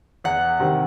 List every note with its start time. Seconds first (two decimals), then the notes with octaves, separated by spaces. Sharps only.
0.24 E2 F#5
0.60 C3 D#3 G3 C4